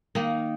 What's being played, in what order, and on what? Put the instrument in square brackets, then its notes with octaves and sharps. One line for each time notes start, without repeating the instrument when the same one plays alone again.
[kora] D#3 A#3 D#4